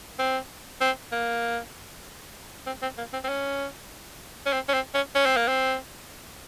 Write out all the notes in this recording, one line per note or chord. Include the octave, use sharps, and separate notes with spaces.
C4
C4
A#3
C4
C4
A#3
C4
C4
C#4
C#4
C4
C#4
C4
C#4
C#4
C4
A#3
C4